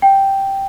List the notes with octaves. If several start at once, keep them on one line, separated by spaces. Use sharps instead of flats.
G5